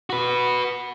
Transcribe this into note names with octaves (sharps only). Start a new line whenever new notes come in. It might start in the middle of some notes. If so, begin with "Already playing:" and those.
F#4 B4